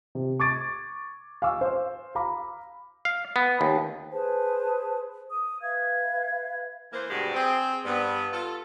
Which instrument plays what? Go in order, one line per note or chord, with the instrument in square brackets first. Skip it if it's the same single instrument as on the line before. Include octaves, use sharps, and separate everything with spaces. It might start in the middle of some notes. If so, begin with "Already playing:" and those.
[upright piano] C3
C#6 D6 G#6 A6 D7
F5 G#5 C#6 D6 E6
C5 F5
F5 A#5 B5 D6
[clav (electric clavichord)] F5
B3
D#2
[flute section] G#4 B4 C5 A5
D#6
B4 E5 F5 G#6
[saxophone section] E3 A#3 C5
G2 B2 G#3 F#4 G4
C4 G#4
G2 B3
F4 A4